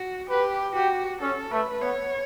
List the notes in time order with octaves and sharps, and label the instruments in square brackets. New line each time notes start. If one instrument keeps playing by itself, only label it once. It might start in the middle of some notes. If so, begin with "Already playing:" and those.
Already playing: [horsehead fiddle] F#4
[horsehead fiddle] G4 [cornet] B4
[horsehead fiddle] F#4 [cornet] G4
[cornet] C#4 [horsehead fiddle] A4
[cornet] A3 [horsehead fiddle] B4
[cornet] B3 [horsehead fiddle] C#5